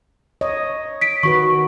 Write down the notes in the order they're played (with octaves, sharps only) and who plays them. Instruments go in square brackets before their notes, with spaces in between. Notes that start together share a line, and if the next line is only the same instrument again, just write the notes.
[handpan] C#5 D#5
[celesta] B6 D7
[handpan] D#3 F#4 B4 [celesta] C#6